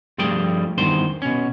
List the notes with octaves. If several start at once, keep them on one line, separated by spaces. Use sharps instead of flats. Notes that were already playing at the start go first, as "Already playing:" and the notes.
G2 F3 G3 A3 G#4 G5
E2 G2 D#3 C5
B2 C#4